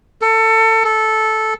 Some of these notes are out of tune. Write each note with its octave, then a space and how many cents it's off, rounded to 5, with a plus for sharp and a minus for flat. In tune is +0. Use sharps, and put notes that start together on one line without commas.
A4 +25
A4 -10